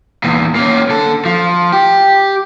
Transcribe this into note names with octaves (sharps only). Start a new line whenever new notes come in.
E2 A#2
A#3 C#4
D3 A4
F3
G4